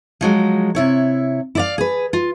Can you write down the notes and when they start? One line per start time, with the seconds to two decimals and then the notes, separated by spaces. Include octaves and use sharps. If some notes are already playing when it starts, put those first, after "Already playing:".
0.21 F3 F#3 G#3
0.75 C3 E4 C#5
1.55 E4 D5 F5
1.78 G#4 B4
2.13 F4